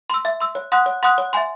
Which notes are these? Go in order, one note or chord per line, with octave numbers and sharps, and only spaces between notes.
C6 E6
E5
C6 E6
C#5
F#5 C6 D#6 F#6
C#5
F#5 C6 D#6 F#6
C#5
E5 G#5 C6